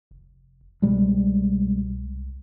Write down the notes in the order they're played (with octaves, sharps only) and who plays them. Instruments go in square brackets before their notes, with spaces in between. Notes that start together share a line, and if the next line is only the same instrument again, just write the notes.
[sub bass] F1
[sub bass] C2 [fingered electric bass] B2 G3 G#3